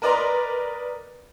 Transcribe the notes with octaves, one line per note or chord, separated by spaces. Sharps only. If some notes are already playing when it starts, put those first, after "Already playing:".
A#4 B4 D5 D#5 A#5 C6